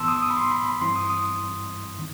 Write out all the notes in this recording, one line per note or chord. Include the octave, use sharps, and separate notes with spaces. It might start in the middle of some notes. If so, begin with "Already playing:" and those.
Already playing: A2 E3 B3 A5 C6 E6
D#6
D#6
B5
C6
B5
B5
G2 E3 G3 C4 E4 C6
D#6
D#6
D#3